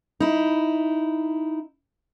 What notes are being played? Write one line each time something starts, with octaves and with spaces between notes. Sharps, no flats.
D#4 E4